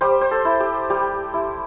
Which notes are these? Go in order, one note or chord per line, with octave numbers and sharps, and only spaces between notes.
G3 G4 C5
C5
A4
E4
G4
G3 G4
E4